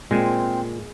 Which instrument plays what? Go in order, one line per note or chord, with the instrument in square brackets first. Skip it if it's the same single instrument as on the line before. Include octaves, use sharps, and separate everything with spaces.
[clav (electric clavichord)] A#2 [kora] G#3 [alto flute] C4